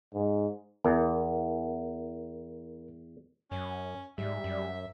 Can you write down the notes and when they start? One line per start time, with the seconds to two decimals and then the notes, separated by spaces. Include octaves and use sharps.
0.14 G#2
0.84 E2 A#4
3.51 F#2 C#4
4.18 G#2 G3 E5
4.44 F#2